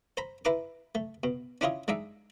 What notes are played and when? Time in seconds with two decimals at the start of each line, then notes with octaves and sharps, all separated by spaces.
0.17 C5 A#5 B5
0.45 E4 B4 A#5 C6 D6
0.95 A3
1.23 B2
1.61 C#4 D4 E4 F4 C#5 D#5
1.88 G#3 D4 D#4 E5